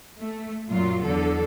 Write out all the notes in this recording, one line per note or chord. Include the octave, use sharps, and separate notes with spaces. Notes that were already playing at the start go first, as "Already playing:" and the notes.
A3
F#2 A#2 F#3 F4
E2 D3 A4